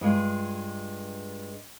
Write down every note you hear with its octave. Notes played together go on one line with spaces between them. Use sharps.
G2 G#3 F4